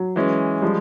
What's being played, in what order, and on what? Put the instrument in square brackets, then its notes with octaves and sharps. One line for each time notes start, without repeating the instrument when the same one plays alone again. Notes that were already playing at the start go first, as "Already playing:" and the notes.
Already playing: [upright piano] F#3
[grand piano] E3 G#3 C#4
[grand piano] F3 G#3 [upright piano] G3